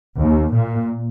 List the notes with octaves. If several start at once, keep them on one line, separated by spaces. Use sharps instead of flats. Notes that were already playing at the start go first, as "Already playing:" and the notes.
D#2
A#2